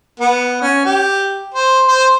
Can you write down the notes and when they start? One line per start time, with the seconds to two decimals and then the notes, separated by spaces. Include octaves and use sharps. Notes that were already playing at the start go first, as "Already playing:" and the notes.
0.20 B3
0.62 C#4
0.85 G4
1.54 C5
1.87 C5